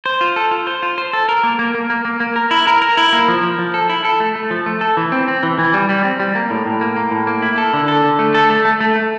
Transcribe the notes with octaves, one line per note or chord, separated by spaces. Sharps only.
C5
F4
A4
F4
C5
F4
C5
A4
A#4
A#3
A#3
A#3
A#3
A#3
A#3
A#4
E4
A#4
A#4
E4
A#3
F3
F3
F3
A4
E4
A4
A3
A3
F3
A3
A4
E3
C4
C4
E3
E3
G3
G3
C4
G3
A#3
A2
A2
A#3
A#3
A2
A#3
E4
A4
D3
A4
D3
A3
A4
A3
A3
A3
A3